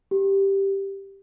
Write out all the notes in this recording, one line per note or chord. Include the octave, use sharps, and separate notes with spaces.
G4